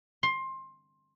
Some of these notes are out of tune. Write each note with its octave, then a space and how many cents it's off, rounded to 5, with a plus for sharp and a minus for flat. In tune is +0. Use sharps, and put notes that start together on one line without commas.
C6 +20